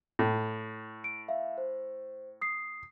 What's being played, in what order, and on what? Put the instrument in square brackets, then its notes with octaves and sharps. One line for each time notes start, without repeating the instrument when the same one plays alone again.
[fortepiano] A2
[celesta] D7
E5 F5
C5
D#6 C7